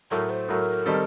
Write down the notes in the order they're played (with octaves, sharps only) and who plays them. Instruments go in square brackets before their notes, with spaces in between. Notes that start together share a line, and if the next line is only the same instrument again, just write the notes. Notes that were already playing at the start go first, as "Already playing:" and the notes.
[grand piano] A2 F#3 A3 [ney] A#4
[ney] C5
[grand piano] A2 F#3 A3 [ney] A#4
[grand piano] D#3 G3 C4 D#4 A4